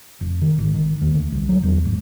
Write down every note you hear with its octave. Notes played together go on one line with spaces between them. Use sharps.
F1
D#3
G#1
D#3
D#2
D2
C2
F#3
E2
G#1